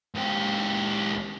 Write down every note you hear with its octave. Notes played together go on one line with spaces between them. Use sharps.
C#2 G4